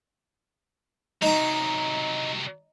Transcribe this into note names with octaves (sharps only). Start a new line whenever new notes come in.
C3 F#3 D#4 A#5